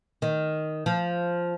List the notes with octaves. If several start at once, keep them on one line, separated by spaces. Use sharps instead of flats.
D#3
F3